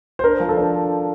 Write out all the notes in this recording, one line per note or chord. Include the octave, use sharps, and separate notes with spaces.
C5
D4 A#4
F3
A4
D4